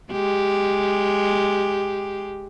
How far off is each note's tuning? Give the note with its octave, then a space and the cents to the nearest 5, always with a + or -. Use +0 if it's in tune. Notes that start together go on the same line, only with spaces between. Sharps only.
G#3 +0 G4 +0